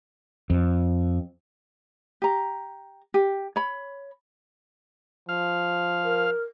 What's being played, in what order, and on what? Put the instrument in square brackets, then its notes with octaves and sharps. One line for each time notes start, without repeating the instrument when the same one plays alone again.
[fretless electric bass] F2
[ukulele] G4 A#5
G4
C#5 B5
[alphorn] F3 [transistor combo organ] F5
[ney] A#4